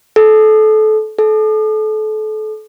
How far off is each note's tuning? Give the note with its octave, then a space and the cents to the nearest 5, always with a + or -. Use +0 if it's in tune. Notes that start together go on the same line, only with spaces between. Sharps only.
A4 -25
A4 -30